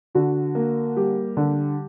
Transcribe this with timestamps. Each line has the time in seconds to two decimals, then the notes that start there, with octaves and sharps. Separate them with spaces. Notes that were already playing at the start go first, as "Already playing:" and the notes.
0.15 D3 F#4
0.55 A#3
0.96 G3 G4
1.37 D3